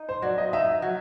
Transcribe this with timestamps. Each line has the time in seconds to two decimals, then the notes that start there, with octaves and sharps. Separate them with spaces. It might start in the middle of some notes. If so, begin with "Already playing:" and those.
Already playing: D#4
0.09 C5
0.22 F#3 D5
0.38 D#5
0.53 D#4 E5
0.82 F#3